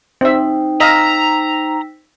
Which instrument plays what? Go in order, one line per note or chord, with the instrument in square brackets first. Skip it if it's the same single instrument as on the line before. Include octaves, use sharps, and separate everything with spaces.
[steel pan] C4 E5 [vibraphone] D#4 C5 G5
[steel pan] D#5 F5 [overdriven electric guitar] A#5 [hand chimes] E6 A#6 B6